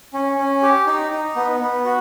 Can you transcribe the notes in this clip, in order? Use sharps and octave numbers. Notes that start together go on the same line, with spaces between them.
C#4
C#4
G4
D#4
D#4
B3
B3
F#4